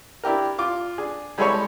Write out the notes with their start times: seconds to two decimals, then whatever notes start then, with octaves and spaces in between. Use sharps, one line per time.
0.24 D4 E4 G4 A#4
0.58 F4 D6
0.98 D4 G#4
1.38 G3 G#3 E4 G#4 A4 C#5